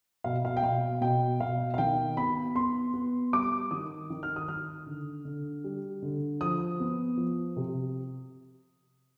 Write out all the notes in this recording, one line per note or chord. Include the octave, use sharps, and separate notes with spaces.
B2 F5
F5
G5
B2 F5
B2 G5
B2 F5
F5
D#3 G5
B3 B5
B3 C6
B3
G3 D6
D#3 D#6
D#3
F6
D#6
D#3 F6
D3
D3
G3
D3
F3 D#6
B3
F3
C3